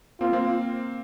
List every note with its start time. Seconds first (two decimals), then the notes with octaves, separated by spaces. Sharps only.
0.21 A#3 C4 F4
0.33 A#3 C4